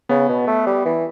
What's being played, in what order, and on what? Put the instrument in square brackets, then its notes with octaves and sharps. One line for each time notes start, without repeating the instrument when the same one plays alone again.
[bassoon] C#3 [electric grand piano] B3
[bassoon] B2
A3
G3
E3